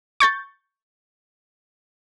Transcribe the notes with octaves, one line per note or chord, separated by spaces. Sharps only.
C#6 G6 A6